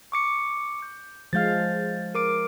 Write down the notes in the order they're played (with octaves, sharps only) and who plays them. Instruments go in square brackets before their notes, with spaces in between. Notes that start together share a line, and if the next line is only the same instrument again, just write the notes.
[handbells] C#6 D6 C#7
G6
[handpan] F3 G#3 F5 [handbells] F6 G6 A6
[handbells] A#4 D6 D7